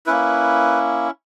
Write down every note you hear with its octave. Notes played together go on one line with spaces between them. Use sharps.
A#3 C#4 E4 B4